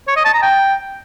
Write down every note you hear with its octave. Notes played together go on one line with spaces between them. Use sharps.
C#5
D#5
A5
A#5
G5